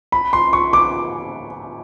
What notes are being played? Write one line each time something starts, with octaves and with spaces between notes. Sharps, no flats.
B5
C6
C#6
D6